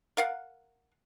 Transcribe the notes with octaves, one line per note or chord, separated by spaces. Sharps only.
A#4 F5 F#5